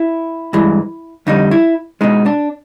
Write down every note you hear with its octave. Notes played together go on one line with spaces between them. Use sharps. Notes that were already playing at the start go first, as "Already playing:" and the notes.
Already playing: E4
G2 E3 G#3
F2 D3 G3 D#4
E4
B2 G#3 D#4
D4